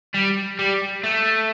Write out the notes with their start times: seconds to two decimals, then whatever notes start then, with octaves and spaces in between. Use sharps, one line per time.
0.15 G3
0.59 G3
1.03 A3